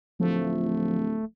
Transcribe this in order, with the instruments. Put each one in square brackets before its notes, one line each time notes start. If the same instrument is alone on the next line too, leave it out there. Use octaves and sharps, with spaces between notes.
[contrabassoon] D1 [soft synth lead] F3 [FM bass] A3